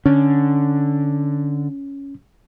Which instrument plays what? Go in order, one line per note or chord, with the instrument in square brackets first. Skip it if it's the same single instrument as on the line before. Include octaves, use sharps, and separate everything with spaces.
[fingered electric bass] D3 [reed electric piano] C#4